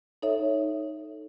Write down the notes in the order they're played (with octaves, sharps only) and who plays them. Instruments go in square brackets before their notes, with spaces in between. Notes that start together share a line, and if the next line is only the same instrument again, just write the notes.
[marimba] D#4 A4 C#5 E5